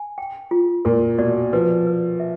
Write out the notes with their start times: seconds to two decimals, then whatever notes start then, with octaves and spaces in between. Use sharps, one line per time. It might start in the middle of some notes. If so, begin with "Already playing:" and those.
Already playing: G#5
0.18 G5
0.51 F4
0.85 A#2 A#4
1.19 B2 D5
1.53 F3 B4
1.87 B4
2.20 E5